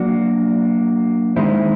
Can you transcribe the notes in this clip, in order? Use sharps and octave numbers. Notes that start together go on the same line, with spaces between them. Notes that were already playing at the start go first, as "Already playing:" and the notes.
Already playing: F#3 A#3 D4 F#4
D#3 G#3 C4 E4